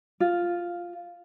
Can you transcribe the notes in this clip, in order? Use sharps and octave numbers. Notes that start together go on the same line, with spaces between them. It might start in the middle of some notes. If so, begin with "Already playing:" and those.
F4